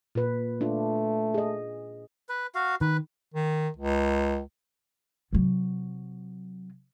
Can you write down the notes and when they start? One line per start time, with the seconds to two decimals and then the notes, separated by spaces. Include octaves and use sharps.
0.15 A#2 B4
0.61 A3 D4 F4
1.34 G#4 D#5
2.29 B4
2.55 F#4 F5
2.81 D#3 B4
3.34 D#3
3.77 C#2
5.33 C3 F#3